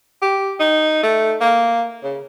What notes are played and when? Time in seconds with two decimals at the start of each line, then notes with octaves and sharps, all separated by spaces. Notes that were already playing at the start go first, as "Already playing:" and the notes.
0.22 G4
0.60 D#4
1.03 A3
1.41 A#3
2.04 C#3